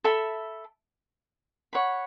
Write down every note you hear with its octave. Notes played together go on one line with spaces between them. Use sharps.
A4 E5 B5
C#5 F#5 B5